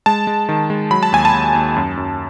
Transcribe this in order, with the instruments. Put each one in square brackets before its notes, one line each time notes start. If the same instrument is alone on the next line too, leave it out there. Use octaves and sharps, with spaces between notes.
[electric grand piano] G#3 A5
G#3
D#3
G#3
F#3 B5
A5
D#2 G#5
A5
D#2
D#2
F#2
F#2